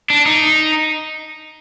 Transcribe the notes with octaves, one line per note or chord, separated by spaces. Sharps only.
D4
D#4